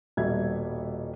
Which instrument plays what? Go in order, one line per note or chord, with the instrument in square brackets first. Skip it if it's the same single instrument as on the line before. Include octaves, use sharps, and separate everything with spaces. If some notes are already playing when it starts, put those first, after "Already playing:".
[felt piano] D#1 B2 G3 E5 G#6